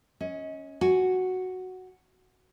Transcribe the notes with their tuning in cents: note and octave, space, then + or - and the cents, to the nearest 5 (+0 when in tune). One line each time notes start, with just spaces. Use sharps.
C#4 +0 D#5 +25
F#4 +0 G#5 +0